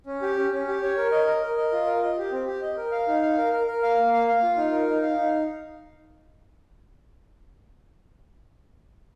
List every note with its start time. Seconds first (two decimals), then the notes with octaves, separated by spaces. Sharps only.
0.06 C#4
0.22 G4
0.36 C#4
0.53 C#4
0.68 G4
0.82 C#5
0.97 A#4
1.12 D#5
1.27 A#4
1.42 A#4
1.57 D#5
1.72 F4
1.87 A#4
2.03 D#5
2.18 G4
2.32 C4
2.47 G4
2.62 D#5
2.77 A#4
2.92 F5
3.08 D#4
3.22 F5
3.38 A#4
3.53 A#4
3.67 A#4
3.83 F5
3.97 A#3
4.13 F5
4.28 F5
4.43 F4
4.57 D#4
4.72 A#4
4.87 D#4
5.02 F5
5.17 D#4